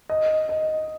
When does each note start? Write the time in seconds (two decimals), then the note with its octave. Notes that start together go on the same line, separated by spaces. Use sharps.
0.09 D#5
0.49 D#5